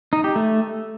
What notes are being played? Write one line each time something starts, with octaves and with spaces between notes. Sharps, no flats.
D#4
G4
A3